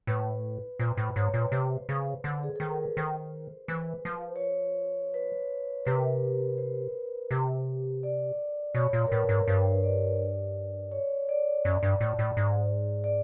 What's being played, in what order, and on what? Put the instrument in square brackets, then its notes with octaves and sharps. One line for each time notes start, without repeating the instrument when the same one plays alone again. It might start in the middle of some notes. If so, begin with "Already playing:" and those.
[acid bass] A2 [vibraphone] B4
[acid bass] A#2 [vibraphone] C5
[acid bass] A2
[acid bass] G#2 [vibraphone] C#5
[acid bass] A#2
[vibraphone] B4
[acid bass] C3 [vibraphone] C5
[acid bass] C#3
D3
[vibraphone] G#4
[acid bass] D#3 [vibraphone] A4
[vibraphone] A#4
B4
[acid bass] D#3 [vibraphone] C5
[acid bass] E3 [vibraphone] B4
[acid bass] F3
[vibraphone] C#5
C5
B4
[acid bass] C3 [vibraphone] B4
[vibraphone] A#4
B4
C5
[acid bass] C3
[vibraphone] D5
[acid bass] B2 [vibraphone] C#5
[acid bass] A#2
[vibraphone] A#4
[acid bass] A2 [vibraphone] B4
[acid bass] G#2
[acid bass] G2 [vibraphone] C5
[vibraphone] D5
C#5
D5
[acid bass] F#2
G2
A2
A2
G#2
[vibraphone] D5